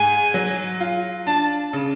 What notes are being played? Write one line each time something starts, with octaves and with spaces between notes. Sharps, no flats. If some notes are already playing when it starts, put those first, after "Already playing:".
Already playing: G#2 G#5
F#3
F4
D4 A5
C#3